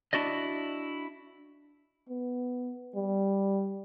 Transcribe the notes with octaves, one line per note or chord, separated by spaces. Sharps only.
D4 E4 F#4 D5 D#5
B3
G3